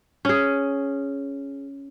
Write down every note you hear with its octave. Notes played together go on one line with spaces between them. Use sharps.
C#4 G#4